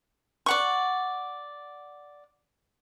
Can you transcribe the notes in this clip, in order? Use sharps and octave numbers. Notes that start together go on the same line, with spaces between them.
D5 F#5 C#6